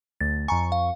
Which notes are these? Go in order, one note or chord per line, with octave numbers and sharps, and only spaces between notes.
D2 A6
F2 G#5 A#5 C#6
F5